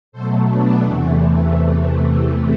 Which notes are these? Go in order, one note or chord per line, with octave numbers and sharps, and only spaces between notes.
B2 F#3 A3 A4 C5
B3 D4
E2 C3 E3 A3